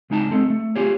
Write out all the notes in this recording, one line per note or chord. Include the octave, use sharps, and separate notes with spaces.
C#2 G#3 D#4 G#5 A5
G#3 C4 A4
A3
F4 G4 G#4 C#5